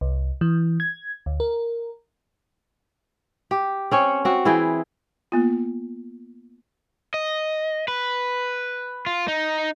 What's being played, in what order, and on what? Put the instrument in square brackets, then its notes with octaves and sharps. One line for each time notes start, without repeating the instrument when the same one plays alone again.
[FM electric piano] C2
E3
G#6
D2
A#4
[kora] G4
C4 C#4 C#5
C4 F#4
E3 E4 G#4 G5
[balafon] A#3 B3 F4
[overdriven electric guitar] D#5
B4
F4
D#4